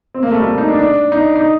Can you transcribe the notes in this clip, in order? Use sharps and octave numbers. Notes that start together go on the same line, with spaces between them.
C4
A#3
A3
G3
A3
D#4
D4
D4
D#4
D#4